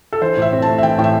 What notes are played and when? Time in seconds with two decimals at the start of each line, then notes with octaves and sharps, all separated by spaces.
0.13 A4
0.21 E3 C5
0.37 A2 E5
0.52 C4
0.62 A5
0.67 A3
0.78 E5
0.83 E3 G5
0.98 A2 G5
1.04 E5